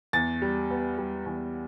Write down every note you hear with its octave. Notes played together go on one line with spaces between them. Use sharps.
E2 A6
G3
B3
G3
E2